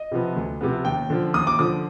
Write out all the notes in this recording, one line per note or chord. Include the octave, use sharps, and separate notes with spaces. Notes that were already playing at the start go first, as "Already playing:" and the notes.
Already playing: D#5
C3 F3 B3
D2
C3 F3 B3
D#2 G5
D3 F3
D#2 D#6
D6
D3 F3 D#6